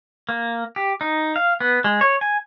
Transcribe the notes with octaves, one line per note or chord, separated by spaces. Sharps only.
A#3
G4
D#4
F5
B3
G#3
C#5
G#5